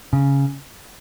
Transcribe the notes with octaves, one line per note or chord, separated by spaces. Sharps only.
C#3